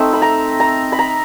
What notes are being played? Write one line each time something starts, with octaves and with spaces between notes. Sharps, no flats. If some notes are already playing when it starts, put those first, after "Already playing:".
Already playing: A3 C4 D#4 E5
B5
A#5
A#5
B5
A#5